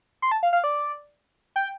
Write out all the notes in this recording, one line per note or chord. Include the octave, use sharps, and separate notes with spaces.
C6
A5
F5
F5
D5
G5